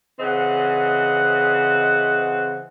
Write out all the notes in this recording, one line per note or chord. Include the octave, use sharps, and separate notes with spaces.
C#3 E3 C4 D#5 F#5